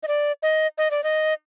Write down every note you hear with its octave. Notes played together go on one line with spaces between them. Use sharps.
D#5
D5
D#5
D#5
D5
D#5